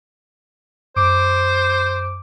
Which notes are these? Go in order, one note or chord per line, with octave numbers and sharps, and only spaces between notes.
F#2 C5 D6 D7